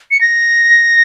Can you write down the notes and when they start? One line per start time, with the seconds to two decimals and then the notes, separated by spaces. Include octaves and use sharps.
0.11 C#7
0.21 A#6